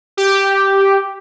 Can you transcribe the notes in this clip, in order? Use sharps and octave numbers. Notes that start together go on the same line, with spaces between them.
G4